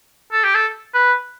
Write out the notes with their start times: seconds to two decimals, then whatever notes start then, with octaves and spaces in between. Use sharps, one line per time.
0.32 A4
0.43 G4
0.54 A4
0.94 B4